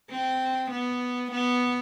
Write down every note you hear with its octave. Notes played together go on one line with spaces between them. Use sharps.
C4
B3
B3